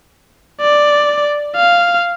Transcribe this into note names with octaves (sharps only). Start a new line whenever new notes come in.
D5
F5